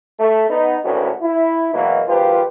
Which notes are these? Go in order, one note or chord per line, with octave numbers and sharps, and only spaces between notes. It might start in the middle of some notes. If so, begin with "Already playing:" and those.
A3
B3 D#4
G#1 D2 A2 C#4 F#4 B4
E4
B2 E3 F#3 G#3 A#3
G#1 F3 F4 G4 B4